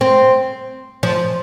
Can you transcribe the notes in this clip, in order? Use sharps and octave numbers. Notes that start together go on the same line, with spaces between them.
C4
F3